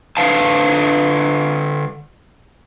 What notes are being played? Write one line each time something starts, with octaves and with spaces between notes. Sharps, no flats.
D3 B4 F5 A5